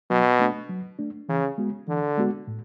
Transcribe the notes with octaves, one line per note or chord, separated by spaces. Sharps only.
B2 F#3
A3 D4
F#3
A3 D4
C#3 E3
G#3 B3 F#4
D3 E3
G#3 B3 F#4
A2